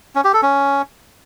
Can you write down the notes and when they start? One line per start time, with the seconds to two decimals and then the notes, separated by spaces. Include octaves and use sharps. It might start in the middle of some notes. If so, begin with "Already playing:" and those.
0.15 C#4
0.24 G4
0.33 A4
0.42 C#4